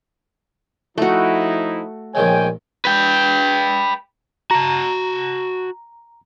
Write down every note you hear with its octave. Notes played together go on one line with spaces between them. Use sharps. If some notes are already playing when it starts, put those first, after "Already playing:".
F3 A3 D#4 E4 F#4
A#1 D#3 G#3 C#5 G5 G#5
B4 G5
F#4 A5 A#5